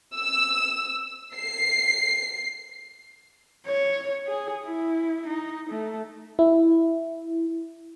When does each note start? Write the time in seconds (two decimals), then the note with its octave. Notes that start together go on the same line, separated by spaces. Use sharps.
0.16 E6
1.34 C7
3.67 C#5
4.27 G#4
4.66 E4
5.27 D#4
5.70 A3
6.39 E4